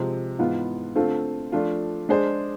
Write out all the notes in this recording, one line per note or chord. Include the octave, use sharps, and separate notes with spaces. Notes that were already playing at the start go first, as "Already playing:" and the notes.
Already playing: C3 F3 G#3 C4
G#2 E3 B3 F4
D3 A3 C4 F4 A4
F3 A3 D4 F4
G#3 D4 G#4 C5